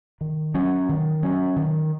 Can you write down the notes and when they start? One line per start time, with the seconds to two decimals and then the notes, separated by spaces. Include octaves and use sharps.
0.21 D#3
0.54 F#3 C#4
0.89 D#3
1.23 F#3 C#4
1.56 D#3